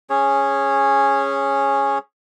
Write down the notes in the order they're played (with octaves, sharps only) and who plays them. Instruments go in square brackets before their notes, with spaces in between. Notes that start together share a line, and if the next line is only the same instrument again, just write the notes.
[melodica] C#4 G#4 C#5